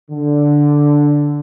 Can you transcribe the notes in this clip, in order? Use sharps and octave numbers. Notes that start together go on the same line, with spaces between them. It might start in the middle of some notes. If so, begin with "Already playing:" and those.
D3